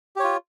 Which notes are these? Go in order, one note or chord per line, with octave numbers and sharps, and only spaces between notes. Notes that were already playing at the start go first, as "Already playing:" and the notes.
F4 G4 C#5